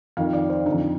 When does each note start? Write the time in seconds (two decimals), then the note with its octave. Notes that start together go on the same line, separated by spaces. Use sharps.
0.17 F2 D#3 F5
0.33 D5
0.50 C5
0.66 F2 D3 D#4